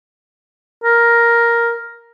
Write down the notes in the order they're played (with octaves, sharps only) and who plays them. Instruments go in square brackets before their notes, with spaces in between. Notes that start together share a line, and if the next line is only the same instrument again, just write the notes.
[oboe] A#4